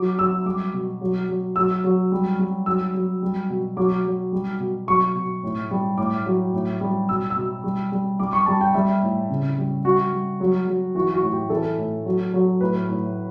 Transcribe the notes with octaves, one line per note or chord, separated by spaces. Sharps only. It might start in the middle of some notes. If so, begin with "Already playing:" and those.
Already playing: F#3 D6
F#3 E6
G3 D6
B2
F#3
F#3
F#3 E6
F#3
G3
G3
F#3 E6
F#3
G3
B2
F#3 D6
F#3
G3
B2
F#3 C#6
B2
A2
G3
A2 D6
F#3
A2
G3
B2 E6
E6
B2
G3
G3
G3 D6
C#6
G3 A5
G5
G3 E5
A2
C#3
G3
G3 F#4
G3
F#3
F#3
E3 F#4
F#4
A2
G4
E3 A4
A2
F#3
F#3
A2 B4
A2